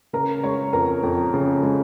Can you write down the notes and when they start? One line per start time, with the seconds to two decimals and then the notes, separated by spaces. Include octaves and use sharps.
0.13 C#3 A#4 A#5
0.43 G#3 C#5 C#6
0.73 F2 A#4 A#5
1.03 F2
1.34 C#3
1.63 G#3